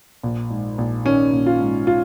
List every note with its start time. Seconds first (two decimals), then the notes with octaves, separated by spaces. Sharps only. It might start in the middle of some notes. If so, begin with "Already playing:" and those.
0.23 A#1
0.50 G#2
0.78 A#1
1.05 D#3 C#4
1.33 A#1
1.46 F4
1.60 G#2
1.87 F4